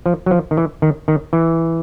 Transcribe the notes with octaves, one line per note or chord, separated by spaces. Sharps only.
F3
F#3
F3
D#3
E3
D#3
D#3
E3